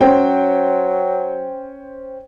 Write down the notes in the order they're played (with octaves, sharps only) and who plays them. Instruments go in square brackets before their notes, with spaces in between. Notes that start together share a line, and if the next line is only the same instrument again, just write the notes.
[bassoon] F#3 [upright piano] C#4 C5 G5